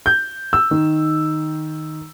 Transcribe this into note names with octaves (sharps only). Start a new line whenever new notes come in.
G6
E6
D#3